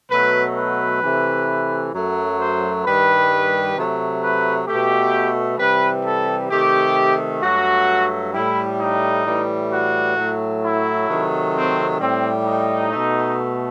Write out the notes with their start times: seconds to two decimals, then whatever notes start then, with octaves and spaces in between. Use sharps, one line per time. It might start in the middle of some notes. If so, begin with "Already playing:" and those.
0.11 B2 F#3 A3 B4
0.56 B4
1.02 C3 E3 A3
1.93 F#2 F#3 A3
2.39 C5
2.85 G2 D#3 G3 B4
3.76 C3 F#3 A3
4.22 B4
4.68 B2 A3 G4
5.59 C3 E3 G3 B4
6.05 A4
6.50 C3 D#3 A3 G4
7.42 G2 F#3 A3 F#4
8.33 A2 G3 E4
8.79 D#4
9.25 A2 E3 G3
9.71 F#4
10.16 A2 F#3 A3
10.62 E4
11.08 C3 D#3 F#3 A3
11.54 C4
12.00 A2 G3 C4
12.46 D#4
12.92 B2 A3